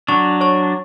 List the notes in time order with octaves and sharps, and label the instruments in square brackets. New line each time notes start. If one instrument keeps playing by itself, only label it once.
[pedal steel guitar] F#3 D4 [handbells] C#6
[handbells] C#5 C#6